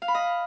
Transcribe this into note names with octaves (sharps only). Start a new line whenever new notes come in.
F5
B5
D#5